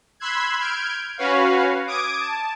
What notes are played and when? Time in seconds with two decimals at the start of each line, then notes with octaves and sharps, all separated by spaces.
0.20 B5 C6 E6 F#6 G#6
0.59 F6 G6 G#6 D7
1.18 C#4 F#4 B4 C#5 F5
1.87 D6 D#6 G#6 D7
2.20 A5